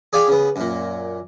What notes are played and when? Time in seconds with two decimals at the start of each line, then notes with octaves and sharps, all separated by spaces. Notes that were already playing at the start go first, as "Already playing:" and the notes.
0.13 G#4 D5 F5 G5 G#5
0.28 C#3 B3
0.56 F#2 A#2